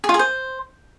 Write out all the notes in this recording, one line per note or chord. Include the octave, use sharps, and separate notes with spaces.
G#4
F4
G#4
C5